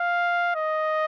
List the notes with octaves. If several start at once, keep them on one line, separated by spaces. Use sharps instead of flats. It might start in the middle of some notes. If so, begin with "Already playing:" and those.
Already playing: F5
D#5